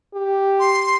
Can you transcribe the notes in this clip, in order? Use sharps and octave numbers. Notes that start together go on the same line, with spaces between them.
G4
C6